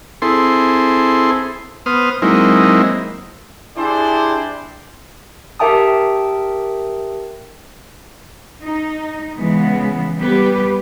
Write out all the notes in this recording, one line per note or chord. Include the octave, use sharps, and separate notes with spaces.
C4 E4 G#4 A4 C6
B3 C5 D#6 F6
F#3 G#3 A#3 C4 D#4 E4
D4 E4 G4 G#4 C5 D5
G4 A#4 E5 G5 A5 D#6
D#4
C#3 E3 G#3 B3
G3 B3 G4 B4